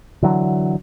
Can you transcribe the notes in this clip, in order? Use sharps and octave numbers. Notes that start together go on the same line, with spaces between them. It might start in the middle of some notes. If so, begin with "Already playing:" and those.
D3 E3 F#3